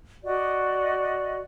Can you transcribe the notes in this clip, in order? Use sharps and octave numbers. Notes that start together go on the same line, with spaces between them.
F#4 D5 D#5